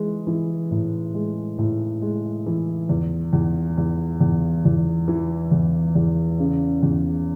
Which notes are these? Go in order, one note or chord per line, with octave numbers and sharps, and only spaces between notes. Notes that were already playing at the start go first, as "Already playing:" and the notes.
Already playing: E3 G#3
E3
A2
G#3
A2
G#3
E3
E2
E2
E2
E2
E2
E3
E2
E2
C#3
E2